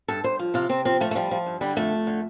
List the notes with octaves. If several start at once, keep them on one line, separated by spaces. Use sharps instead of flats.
G2 A4
G2 C5
F3
C3 F4
C3 C4
F3 C4
F3 A3
A3
F3 G3
F3
G2
D3 G3
F2 A3
F2
D3